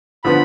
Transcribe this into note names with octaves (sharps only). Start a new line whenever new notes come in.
D3 F3 B3 B5